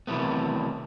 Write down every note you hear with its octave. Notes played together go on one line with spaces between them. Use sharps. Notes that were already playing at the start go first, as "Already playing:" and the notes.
C3 D#3 E3 F#3 A3 B3